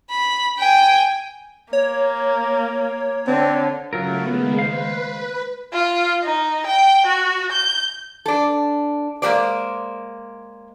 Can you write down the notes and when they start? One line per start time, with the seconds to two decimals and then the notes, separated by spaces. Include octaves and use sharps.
0.10 B5
0.59 G5 G#5
1.73 A#3 C#5
3.27 D3 C4
3.93 C#3 F#3 A3 F4 A#4
4.26 D#3 G#3 A#3 B3
4.59 B4 C5 F5
5.73 F4
6.23 D#4
6.66 G5
7.06 F#4
7.52 G6
8.26 D4 A4
9.22 G#3 A#3 F#4 G4 C5 D5